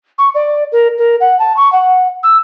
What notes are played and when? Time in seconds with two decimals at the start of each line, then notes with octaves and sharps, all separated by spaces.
0.18 C#6
0.35 D5
0.72 A#4
0.98 A#4
1.20 F#5
1.39 A5
1.57 C#6
1.72 F#5
2.23 E6